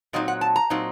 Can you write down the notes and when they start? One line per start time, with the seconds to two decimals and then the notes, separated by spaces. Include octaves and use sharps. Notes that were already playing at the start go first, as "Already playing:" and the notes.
0.13 A#2 F#3 C4 D#4 D#5
0.28 F#5
0.41 A5
0.56 A#5
0.70 A#2 F#3 C4 D#4